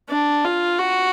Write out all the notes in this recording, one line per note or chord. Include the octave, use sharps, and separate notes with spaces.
D4
F4
F#4